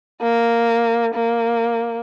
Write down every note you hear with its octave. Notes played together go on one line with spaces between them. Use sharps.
A#3
A#3